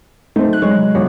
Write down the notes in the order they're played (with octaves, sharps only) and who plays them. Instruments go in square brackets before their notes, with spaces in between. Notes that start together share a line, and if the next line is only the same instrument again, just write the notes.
[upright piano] A3 C4 [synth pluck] D#4
[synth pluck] F#3 F#6
[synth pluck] F#3 C#5 [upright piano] G#3
[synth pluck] C3 F#3
[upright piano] G1 [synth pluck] F#4